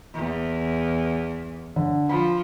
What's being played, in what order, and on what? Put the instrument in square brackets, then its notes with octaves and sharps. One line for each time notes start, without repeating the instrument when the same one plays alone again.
[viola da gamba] E2
[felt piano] D3
[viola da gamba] F3 [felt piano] B5